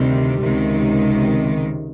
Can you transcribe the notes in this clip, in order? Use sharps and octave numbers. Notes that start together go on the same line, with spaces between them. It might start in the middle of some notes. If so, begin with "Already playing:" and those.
Already playing: D2 C3 D#3 G3
C#2 C3 D#3